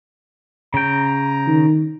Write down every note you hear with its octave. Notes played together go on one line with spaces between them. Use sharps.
C#3 G5 A#5
D#3